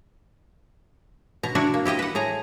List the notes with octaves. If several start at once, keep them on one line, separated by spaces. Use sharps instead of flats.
B2 A#5
D4 E4 F#4
A#3
E4 G4 D#5 G5
B4 F#5
A2 G#4 A#5